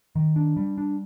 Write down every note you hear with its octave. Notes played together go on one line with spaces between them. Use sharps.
D#3
D4
G3
D4